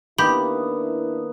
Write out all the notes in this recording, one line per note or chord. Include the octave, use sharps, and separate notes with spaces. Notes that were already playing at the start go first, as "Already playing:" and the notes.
D#3 A#3 B3 D4 E4 G4 B5